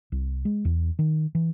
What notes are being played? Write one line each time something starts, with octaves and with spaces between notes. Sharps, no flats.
C2
G#3
E2
D#3
E3